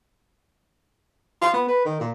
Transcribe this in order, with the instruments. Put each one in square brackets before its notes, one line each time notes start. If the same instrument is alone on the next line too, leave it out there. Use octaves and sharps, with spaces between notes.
[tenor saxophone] F4
B3
B4
D#3
A#2